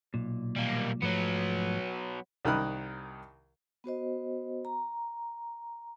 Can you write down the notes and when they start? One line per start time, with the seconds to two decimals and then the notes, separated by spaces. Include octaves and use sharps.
0.14 B1 A#2
0.56 G3 A#3
1.02 G#2 F3 F#3 A3 B3
2.45 C2 D#3 A#4 B5 D#6 F#6
3.84 B3 F#4 C5 D#5
4.65 A#5